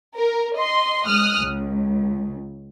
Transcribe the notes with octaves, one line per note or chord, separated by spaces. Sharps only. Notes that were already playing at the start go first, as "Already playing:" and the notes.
A#4
D#5 C6
G#3 D#6 F6 F#6
C#2